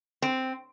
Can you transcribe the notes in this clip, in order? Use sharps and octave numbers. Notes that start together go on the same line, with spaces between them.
C4